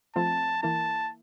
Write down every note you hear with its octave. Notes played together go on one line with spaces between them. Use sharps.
F3 A3 C4 F4 A5
E3 A#3 E4 A5